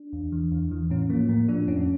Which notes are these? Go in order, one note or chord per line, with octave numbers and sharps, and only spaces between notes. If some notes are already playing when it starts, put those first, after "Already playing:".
Already playing: D4
E2
E3
E2
E3
A2 C#4
F3 A#3
A2 A#3
F3 D4
F2 C#4